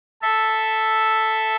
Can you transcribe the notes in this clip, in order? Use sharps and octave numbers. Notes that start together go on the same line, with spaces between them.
A4 E5